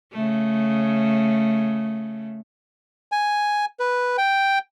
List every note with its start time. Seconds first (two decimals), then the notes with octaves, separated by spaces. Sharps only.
0.13 C#3 A3
3.12 G#5
3.79 B4
4.18 G5